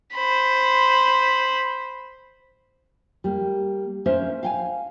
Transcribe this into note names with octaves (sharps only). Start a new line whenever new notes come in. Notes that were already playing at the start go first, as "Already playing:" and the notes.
C5 B5
G3 A#3
A#3 C#4 C5 E5
F5 G5 G#5